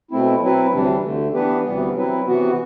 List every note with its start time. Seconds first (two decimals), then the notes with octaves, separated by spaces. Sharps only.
0.11 B2 A3 C4 E4
0.41 F#3 C4 E4 B4
0.72 D2 C3 E3 G3 D4
1.04 D2 D3 A3
1.34 E3 B3 D4 G4 B4
1.65 D2 C3 E3 G3 B3
1.95 F#3 C4 E4 B4
2.26 C3 E3 B3 F#4